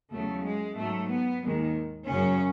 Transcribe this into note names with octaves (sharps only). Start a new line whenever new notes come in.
E2 C#3 F#3 A3
G#3
G#2 F#3 A3
B3
D#2 D#3 G#3
F#2 C#3 F#3 C#4